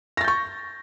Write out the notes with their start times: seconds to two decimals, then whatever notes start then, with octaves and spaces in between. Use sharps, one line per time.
0.17 A#6
0.21 A6
0.24 G6
0.28 C#6